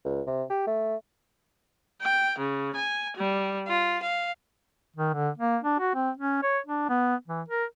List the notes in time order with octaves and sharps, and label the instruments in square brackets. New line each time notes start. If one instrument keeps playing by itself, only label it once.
[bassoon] C#2
C3
G4
A3
[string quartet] G5
C#3
G#5
G3
F4
F5
[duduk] D#3
D3
A#3
D4
F#4
C4
C#4
C#5
D4
B3
E3
A#4